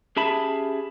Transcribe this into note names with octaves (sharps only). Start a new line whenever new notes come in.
C#4 G4 G#4 E5 A5 B5